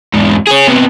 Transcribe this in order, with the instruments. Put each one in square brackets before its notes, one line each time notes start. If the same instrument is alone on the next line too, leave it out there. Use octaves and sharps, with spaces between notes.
[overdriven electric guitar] E2 G#2
G#4 C#5
C3 B3